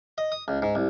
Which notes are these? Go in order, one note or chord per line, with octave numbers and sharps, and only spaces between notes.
D#5
D#6
C#2
G#2
C2